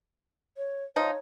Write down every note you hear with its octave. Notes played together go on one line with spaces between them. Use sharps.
C#5
F3 D#4 C#5